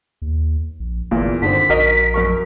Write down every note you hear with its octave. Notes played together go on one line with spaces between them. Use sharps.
D#2
A#1
G1 E2 A#2
G2 D3 D#3 C4 B6
A#1 F#4 A#4 D#5
F#2 A#4 C#6